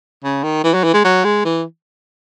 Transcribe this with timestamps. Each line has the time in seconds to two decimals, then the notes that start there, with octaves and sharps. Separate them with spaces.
0.24 C#3
0.43 D#3
0.64 E3
0.74 F#3
0.84 E3
0.94 G#3
1.04 F#3
1.24 G#3
1.45 E3